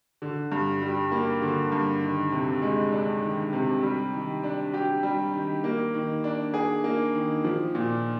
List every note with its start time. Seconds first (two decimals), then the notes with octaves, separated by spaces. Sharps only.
0.22 D3
0.52 G2
0.82 G3
1.12 A#3
1.42 D3
1.72 G2
2.02 D#3
2.32 C3
2.62 G#3
2.92 D4
3.23 D#3
3.53 C3
3.83 G3
4.13 D#3
4.43 D4
4.74 G4
5.03 G3
5.34 D#3
5.64 A#3
5.94 D#3
6.24 D4
6.54 G#4
6.84 A#3
7.15 D#3
7.44 F3
7.75 A#2